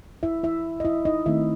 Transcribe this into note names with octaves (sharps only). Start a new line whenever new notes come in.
E4 E5
E4 E5
D#5
E4 E5
D#4 D#5
D#3 A3 C4 E4 E5